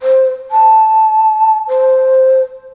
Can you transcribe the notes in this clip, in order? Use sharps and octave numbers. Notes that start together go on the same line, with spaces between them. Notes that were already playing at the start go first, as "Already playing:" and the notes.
C5
A5
C5